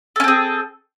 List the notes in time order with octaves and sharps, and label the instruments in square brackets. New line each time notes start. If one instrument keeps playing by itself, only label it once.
[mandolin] A4
C#4
C4
G#4